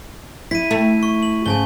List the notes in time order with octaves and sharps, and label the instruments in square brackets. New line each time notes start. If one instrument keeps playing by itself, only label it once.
[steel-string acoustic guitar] E4 [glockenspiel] B6 D#7
[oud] A3
[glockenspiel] C#6
F#7
[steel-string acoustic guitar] G#2 C#3 [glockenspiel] G#5 A5 G7